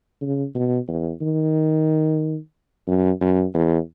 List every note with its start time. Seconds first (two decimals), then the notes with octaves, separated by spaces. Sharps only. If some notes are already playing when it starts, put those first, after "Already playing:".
0.21 C#3
0.55 B2
0.88 E2
1.21 D#3
2.87 F#2
3.21 F#2
3.54 E2